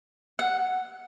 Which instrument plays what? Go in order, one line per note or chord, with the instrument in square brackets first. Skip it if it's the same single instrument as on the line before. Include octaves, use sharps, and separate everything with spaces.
[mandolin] F#5